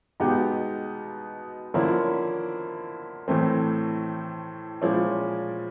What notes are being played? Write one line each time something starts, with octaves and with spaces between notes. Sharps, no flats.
B2 G#3 B3 D#4 G4
D3 F3 A#3 C#4 E4
A2 E3 A3 C4
A#2 F3 G#3 C#4 E4